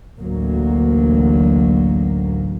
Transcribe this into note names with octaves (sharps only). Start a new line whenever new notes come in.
A1 D2 F#3 A#3